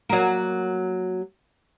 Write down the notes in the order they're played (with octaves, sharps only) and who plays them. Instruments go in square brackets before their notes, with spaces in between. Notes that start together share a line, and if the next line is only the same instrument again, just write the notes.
[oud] F#3 A#3